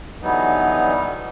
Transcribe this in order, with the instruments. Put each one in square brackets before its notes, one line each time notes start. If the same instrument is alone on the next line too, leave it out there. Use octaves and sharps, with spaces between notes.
[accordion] D3 E3 F#3 G3 B3 D#4